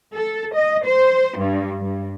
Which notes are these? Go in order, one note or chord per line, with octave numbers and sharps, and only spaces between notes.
A4
D#5
C5
G2
G2